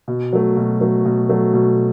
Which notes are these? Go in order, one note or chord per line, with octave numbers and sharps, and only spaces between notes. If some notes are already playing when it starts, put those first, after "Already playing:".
B2
F#3 A3
B2
F#3 A3
B2
F#3 A3
B2